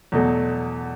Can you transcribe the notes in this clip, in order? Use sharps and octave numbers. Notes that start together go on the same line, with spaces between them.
E2 B2 F#3 A3